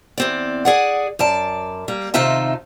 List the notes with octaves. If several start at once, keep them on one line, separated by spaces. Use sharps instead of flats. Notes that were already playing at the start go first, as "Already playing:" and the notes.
E2 C4 D5
G#4 D5 F#5
F#2 D5 A5
G3 A#3
C3 D#3 D#4 F4 E5 A5